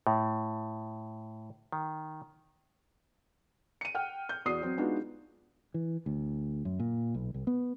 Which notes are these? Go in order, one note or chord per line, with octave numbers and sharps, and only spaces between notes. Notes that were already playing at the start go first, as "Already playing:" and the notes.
A2
D#3
C#7 D#7
F#5 G5 F6
G6
E2 F#4 D5 D#6 C7
F#3 C4
G#3 B3 D4 D#4 F4 F#4
E3
D2
F#2
A#2
B1
C2
B3